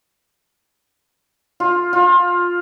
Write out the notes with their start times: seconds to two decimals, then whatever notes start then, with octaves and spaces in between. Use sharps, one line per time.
1.60 F4
1.93 F4